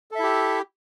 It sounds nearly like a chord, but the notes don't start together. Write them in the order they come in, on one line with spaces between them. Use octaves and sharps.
A4 E5 E4 G4